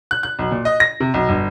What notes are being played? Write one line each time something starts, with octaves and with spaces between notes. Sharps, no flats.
F#6
F#6
B1
A#2
D#5
A#6
C3
B1
G1